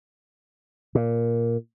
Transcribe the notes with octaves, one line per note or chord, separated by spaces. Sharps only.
A#2